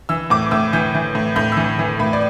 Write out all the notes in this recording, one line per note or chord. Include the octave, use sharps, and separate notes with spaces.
E3 E6
A2 D6
A2 E6
E3 G6
E3
A2
A2 G6
E3 E6
E3
A2 B5
D5